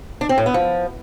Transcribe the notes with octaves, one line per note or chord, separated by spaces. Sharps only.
D4
C4
A2
B3
F3